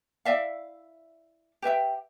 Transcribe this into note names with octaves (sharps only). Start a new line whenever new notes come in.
E4 D5 E5 F5
G4 B4 E5 G5